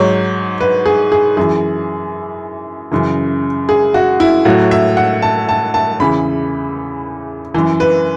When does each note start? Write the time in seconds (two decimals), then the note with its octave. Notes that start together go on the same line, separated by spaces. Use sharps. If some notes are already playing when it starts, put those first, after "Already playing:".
Already playing: G#2 F#3 C#5
0.61 B4
0.86 G#4
1.12 G#4
1.37 F#2 E3 G#4
2.92 F#2 C#3 E3
3.69 G#4
3.94 F#4
4.20 E4
4.45 A2 F#3 F#4
4.71 E5
4.97 F#5
5.22 A5
5.49 A5
5.74 A5
6.00 E2 C#3 E3 B5
7.54 F#2 E3
7.80 B4